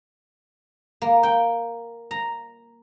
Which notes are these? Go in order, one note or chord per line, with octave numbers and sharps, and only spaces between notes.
A#3
G5
A#5